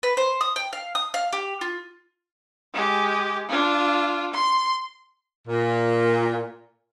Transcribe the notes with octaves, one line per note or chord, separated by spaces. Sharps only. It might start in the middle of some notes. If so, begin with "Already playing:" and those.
B4
C5
D#6
G5
F5
D#6
F5
G4
F4
G#3 G4
D4 F4
C6
A#2